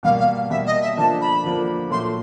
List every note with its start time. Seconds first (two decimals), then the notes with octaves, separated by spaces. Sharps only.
0.03 B2 G3 A#3 F5
0.19 F5
0.50 B2 G3 A#3 E5
0.66 D#5
0.81 E5
0.97 D3 F3 A#3 D4 A5
1.21 B5
1.44 D3 F3 A#3 D4
1.91 A#2 F#3 A3 C6